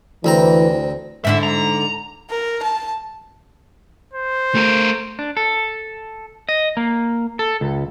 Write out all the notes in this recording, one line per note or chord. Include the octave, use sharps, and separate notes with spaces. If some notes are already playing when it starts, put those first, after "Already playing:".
D2 E3 C4 A#5
G#2 D3 E4 E5
A#5
A#4
A5
C5
A3 A#4
D4
A4
D#5
A#3
A4
C#2